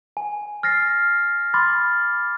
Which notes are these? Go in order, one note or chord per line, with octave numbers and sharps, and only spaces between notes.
G#5
F6 A6 A#6 C7
B5 C6 D6 F6 A6